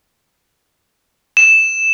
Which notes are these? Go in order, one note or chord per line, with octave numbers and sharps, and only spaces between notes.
E7